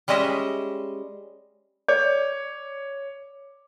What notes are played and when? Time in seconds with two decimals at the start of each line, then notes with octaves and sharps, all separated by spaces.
0.08 G3 G#3 C#4 D#5 E5
1.88 C#5 D5 D6